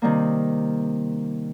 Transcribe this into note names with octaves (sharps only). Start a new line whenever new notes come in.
C3 D#3 G3 A#3